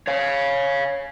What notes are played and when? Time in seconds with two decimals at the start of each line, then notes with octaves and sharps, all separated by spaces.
0.07 C#5 F5